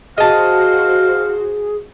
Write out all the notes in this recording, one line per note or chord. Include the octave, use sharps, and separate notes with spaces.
F#4 G#4 C5 D#5 F5 A5